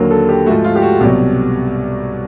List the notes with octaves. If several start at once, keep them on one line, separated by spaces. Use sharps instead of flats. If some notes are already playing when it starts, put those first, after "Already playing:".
Already playing: D#2 D3 F#3 A#3
A4
G4
G#2 F3 A3 F#4
F4
G4
F#4
C2 B2 F#3 G4